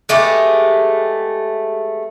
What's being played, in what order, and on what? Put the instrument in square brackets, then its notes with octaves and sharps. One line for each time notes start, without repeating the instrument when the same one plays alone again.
[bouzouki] G#3 A3 B3 G4